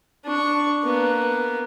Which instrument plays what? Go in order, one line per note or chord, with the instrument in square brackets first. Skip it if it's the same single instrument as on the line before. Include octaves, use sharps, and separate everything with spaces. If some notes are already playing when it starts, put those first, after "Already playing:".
[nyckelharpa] D4 C#6
A#3 B3